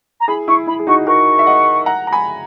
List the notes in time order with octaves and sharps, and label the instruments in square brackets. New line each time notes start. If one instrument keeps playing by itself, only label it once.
[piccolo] A#5
[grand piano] E4 G#4 [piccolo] B5
[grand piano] E4 [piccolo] C#6
[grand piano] E4 [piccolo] B5
[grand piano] G#4
[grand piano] D#4 F#4 [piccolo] C#6
[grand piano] F#4 A#4 [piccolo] C#6
[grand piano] E5
D#5 F#5
F#5 A#5
A#5
G#5 B5